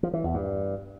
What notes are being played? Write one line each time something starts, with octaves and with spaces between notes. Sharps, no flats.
F3
E3
E2
G2